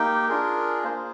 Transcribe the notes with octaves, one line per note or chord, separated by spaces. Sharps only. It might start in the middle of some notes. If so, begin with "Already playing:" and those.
Already playing: A#3 D#4 G4 G5
D4 F4 G#4 A#4
A#3 F4 G#4 C5